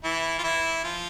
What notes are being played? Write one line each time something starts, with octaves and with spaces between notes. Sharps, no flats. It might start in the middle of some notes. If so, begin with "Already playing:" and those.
E3 E4
F4
E3 E4
F3 F4